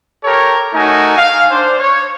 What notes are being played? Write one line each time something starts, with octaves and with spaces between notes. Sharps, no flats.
G4 A4 A#4 C#5
A3 D#4 F#4 A#4 G#5
F5
D4 C5
C#5